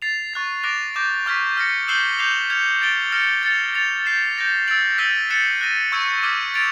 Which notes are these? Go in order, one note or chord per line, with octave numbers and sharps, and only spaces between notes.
A6 C7 F7
C#6 F#6 A6
D6 F#6 A#6 D7 F7
D6 G6 A#6 D7
C#6 F6 G#6 B6
F6 A#6 C#7
E6 G6 C7 E7 G7
D6 G6 C7 F7
F6 G#6 C#7 F7
A6 D7 G7
F6 A#6 C#7 E7
A6 C#7 F7
A6 C#7 F7
G6 C7 E7
G6 A#6 D7
E6 A6 D7 F#7
E6 G6 B6 D#7 G7
F#6 A6 C#7 E7
F#6 A#6 D#7
C#6 E6 G#6 C#7
D6 F6 G#6 B6 D#7
A6 D7 F7